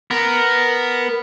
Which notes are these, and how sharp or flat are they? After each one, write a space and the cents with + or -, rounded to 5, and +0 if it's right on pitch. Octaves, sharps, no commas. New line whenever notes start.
B3 +0 A#4 +0